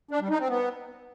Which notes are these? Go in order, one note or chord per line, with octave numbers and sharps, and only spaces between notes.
D4
G3
D#4
C4
B3